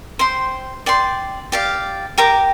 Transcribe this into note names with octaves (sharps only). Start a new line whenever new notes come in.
C5 G5 C6
D5 G5 C6
G4 D5 F5
G4 A#4 G5 D6